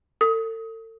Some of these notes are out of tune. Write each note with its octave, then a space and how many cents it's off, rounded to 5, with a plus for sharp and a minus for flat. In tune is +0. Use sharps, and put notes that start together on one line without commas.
A4 +40 D#6 +20